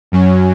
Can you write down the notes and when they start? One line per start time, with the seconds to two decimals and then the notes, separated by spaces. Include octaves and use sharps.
0.12 F#2 F#3 C#4